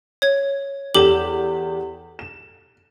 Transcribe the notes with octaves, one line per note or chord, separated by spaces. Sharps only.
C#5 G#6
E2 G4 A4 D6 E7 F#7
E7